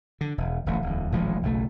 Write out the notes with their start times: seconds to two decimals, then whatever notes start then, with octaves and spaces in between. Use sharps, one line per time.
0.21 D3
0.38 E1
0.66 D1 A1
0.83 D1 E2
1.12 D#1 A1 F3 G#3
1.43 F#1 B1 A3